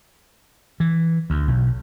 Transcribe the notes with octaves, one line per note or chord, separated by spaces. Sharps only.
E3
D2
B1